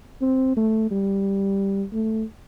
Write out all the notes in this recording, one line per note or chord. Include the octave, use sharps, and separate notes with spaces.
C4
A3
G3
A3